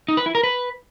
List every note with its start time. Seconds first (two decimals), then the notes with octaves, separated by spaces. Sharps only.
0.08 D#4
0.17 B4
0.26 E4
0.35 A#4
0.43 B4